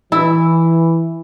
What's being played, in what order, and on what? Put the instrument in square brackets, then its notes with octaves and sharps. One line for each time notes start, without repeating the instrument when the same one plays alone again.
[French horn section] E3 [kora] E4